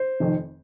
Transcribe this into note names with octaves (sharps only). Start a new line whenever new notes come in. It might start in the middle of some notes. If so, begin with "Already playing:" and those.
Already playing: C5
F1 F2 D#3